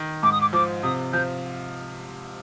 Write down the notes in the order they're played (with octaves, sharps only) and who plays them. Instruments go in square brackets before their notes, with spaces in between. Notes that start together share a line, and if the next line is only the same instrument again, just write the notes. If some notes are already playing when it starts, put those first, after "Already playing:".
Already playing: [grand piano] D#3
[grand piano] G#2 [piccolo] D6
[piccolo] D#6
D6
[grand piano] F3 [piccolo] D6
[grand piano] C3 [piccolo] D#6
[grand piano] F3 [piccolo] G6